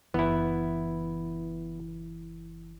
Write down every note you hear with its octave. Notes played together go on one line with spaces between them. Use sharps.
F#1 E3 B3 E4